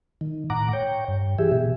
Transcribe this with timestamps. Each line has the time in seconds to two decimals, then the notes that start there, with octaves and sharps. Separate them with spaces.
0.21 D#3
0.50 A2 F#5 A#5 D6
0.73 C#5 G5
1.08 G2
1.39 E3 G4 G#4 E5
1.52 B2